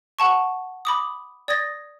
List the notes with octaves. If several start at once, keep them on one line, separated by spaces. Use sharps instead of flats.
F#5 A5 C#6
B5 D6 D#6
D5 D#6 G#6 A#6